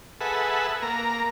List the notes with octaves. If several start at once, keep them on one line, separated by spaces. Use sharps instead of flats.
G#4 A4 B4 E5 F#5
A#3 A#5